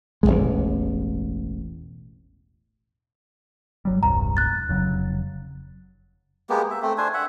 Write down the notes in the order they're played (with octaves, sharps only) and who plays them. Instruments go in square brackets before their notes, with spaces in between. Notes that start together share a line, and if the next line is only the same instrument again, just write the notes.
[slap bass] E1 A1 A2 G#3
[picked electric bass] F#1 F#3 G3
[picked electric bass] E1 C2 G2 [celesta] A#5
[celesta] F#6 A6
[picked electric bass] F1 C#3 F#3
[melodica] G#3 A#3 B3 G4
E5
A3 C4
D4 C5 G#5
E5 F#5